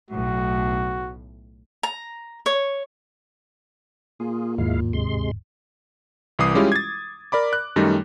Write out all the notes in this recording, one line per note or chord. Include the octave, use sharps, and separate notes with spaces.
B1 A2 F#4
A#5
C#5
A#2 F4 G#4
D1 D#2 G#2 G#3 E4 F5
C3 G#3 C6
C2 E3 D6 D#6 C7
G3 G#3 C#4 E4 F4 G4
G#6 A6
A#4 D5 B5 D6
F#6
F#2 D#3 G3 A3 D#4